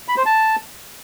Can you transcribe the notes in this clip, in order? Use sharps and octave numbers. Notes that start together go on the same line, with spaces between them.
B5
C5
A5